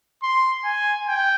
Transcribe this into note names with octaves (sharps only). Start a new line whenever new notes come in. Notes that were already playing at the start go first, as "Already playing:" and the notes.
C6
G#5
G5